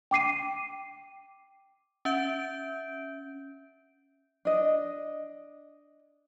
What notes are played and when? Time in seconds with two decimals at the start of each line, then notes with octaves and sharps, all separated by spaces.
0.11 G5 D6 C7 D#7
2.05 C#4 E5 G6 D7
4.45 D4 D#5